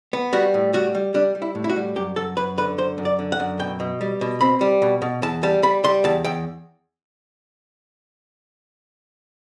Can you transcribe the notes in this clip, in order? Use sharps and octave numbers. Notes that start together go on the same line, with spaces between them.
B3
G3 F#4
A2
G3 F#4
G3
G3 D4
G3
E4
A2
E4
F#4
G3
F#2 G4
F#2 A4
F#2 B4
D3 B4
F#2 C5
F#2
D5
D3
F#5
F#2
B2 G5
B2
G3
B2
C4 B5
G3
B2
B2
E2 A5
G3 A5
G3 B5
G3 C6
E2 A5
E2 G5